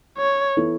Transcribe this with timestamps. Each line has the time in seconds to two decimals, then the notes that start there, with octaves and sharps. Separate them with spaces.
0.18 C#5
0.57 E3 B3 E4 A4